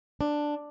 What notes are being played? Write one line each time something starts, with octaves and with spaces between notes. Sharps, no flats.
D4